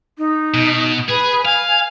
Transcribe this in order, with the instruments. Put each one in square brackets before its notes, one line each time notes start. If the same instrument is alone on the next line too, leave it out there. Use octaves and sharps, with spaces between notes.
[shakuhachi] D#4
[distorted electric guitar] B2
[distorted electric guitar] G#4 [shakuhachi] B4
[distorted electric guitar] F5 [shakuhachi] G#5